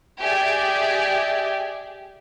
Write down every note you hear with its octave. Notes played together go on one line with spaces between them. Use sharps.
G4 G#4 D5 E5